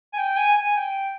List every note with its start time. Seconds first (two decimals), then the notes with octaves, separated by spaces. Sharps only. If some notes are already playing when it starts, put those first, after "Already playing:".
0.13 G#5
0.18 G5
0.37 G#5
0.56 G#5
0.77 G5